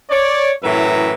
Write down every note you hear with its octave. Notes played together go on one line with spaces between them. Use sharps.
C#5 D5
F#2 A2 E3 B4 E5 A#5